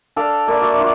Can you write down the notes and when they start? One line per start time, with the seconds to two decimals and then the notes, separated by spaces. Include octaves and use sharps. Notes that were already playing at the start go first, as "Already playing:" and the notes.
0.16 D4 A4 D5 F5
0.47 A#3 B4 D5 E5
0.61 F#4 E5
0.78 D4 F4 F#4